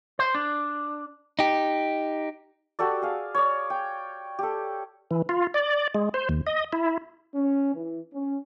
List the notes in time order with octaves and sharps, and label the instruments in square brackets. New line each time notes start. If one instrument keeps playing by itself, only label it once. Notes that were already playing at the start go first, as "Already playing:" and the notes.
[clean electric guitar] C5
D4
D#4 G4
[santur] F#4 G4 A4 D5
G#4 F5
C#5 D5
G5
G4 A4
[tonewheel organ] E3
F4
D5
G#3
C5
D#2
D#5
E4
[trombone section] C#4
E3
C#4